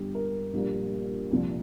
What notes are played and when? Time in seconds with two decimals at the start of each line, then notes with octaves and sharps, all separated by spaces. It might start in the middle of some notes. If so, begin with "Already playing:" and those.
Already playing: G1 G2 G3 G4
0.15 A#4
0.53 A#1 A#2 G3 A#3
1.31 C2 A#2 F3